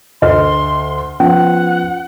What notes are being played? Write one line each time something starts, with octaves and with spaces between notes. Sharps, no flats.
D2 A4 D#5 C6 F6
F3 B3 C#4 F#5